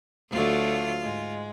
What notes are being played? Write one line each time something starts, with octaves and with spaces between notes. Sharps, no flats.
D2 D3 F#3 A3 F4
G#2 G#3